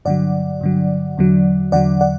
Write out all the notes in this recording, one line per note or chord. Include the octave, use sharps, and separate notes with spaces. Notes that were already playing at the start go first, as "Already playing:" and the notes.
G2 D3 F#3 D5 F#5
G2 D3 F#3
E2 D3 F#3
E2 D3 F#3 D5 F#5
D5 F#5